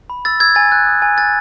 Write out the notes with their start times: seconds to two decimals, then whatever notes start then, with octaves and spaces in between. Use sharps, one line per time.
0.10 B5
0.25 E6 A6
0.40 E6 G#6
0.55 G#5 A6
0.72 F#6
0.86 D#6
1.02 G#5
1.17 F#6 A6